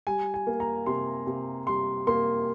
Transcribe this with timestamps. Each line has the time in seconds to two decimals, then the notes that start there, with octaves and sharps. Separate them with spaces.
0.07 G3 G#5
0.34 G#5
0.47 A#3
0.60 A#5
0.86 C3 C6
1.27 C3
1.67 G3 C6
2.07 A#3 C6